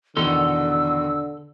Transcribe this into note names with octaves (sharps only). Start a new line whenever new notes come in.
E2 B2 D3 D#3 A4 C6 E6